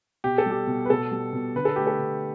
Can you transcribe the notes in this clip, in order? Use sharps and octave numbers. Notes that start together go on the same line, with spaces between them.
B2 G4
A4
G3
G4
B2
B4
B2 A4
G3
B2
D3 B4
A4
A3 G4
A4
D3